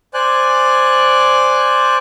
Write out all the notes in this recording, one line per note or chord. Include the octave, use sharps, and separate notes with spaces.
C5 D5 G#5 F#6